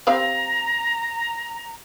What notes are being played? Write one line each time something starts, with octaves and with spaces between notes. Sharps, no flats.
C4 G4 F5 A#5